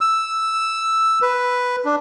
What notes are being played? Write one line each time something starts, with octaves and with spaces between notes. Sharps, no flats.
E6
B4
D4